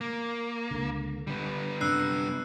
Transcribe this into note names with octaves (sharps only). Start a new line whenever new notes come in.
A#3 D6
C#2 D3
D3 G3 B3
F#2 C3 D4 E6 F#6 C7